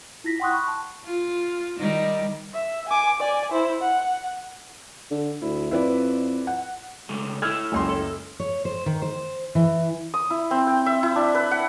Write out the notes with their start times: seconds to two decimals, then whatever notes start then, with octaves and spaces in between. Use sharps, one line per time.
0.24 E4 F4 A#6 B6
0.40 F#5 G5 C6 C#6 D#6 F#6
0.52 B5 C#6
0.68 A5
1.05 F4
1.79 D#3 G3 D#4
2.54 E5
2.88 G#5 D6
3.20 D5 G#5
3.52 E4 C5
3.81 F#5
5.11 D3
5.42 D2 E4
5.71 F2 E4 B4 D5
6.47 F#5
7.09 C#3 G#3 A3
7.42 A3 E4 E6 F6 G#6
7.72 F#1 C#2 C6
7.89 A4
8.40 C#5
8.65 C5
8.86 D#3
9.02 C5
9.55 E3
10.14 D#6
10.30 E4
10.51 C4
10.67 G5
10.86 E5
11.03 E4
11.16 D4
11.35 B4
11.51 F#5